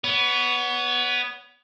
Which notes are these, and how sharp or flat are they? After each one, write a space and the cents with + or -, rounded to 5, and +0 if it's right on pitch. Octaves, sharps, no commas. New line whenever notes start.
B3 +0 C#5 +35